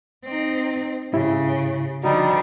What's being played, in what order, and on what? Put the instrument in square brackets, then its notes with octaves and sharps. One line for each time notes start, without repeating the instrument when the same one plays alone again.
[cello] C4 D#4
[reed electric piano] G#2 E4 G4 [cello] C#3
[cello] D3 F3 [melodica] G3 D#4 [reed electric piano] F#4